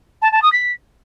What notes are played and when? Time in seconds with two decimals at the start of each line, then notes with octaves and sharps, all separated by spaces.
0.22 A5
0.32 A5
0.42 D#6
0.52 B6